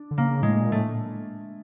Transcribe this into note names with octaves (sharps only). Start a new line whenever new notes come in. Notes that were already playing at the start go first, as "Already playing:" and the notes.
Already playing: D4
D3
C#3 A#3
A2 G#3
A#2
A2 A3